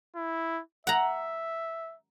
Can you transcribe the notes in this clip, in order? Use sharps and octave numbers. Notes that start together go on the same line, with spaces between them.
E4
E5 F#5 A#5